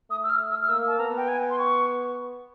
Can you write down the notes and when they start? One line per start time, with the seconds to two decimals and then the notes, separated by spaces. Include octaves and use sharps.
0.10 A3 D#6
0.23 E6
0.30 F6
0.50 E6
0.62 F6
0.69 A#3 E6
0.87 A5
0.99 B3 A#5
1.17 G5
1.28 G#5
1.50 C6
1.58 C#6